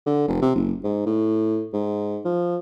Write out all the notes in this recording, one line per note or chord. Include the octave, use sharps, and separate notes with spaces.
D3
F1
C3
F#1
G#2
A2
G#2
F3